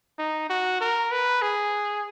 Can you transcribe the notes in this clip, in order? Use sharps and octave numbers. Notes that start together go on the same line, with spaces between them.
D#4
F#4
A#4
B4
G#4